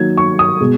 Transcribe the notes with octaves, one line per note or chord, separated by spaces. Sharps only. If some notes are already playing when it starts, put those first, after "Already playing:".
Already playing: D#3 F#3 A#3 G#6
C#6
D#6
B2 G#3